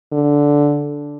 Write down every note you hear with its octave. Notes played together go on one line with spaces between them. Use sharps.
D3